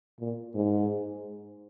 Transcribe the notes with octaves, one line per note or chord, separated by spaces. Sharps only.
A#2
G#2